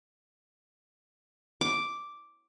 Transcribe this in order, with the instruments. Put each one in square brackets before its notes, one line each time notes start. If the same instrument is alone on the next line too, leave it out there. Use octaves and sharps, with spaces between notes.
[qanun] D6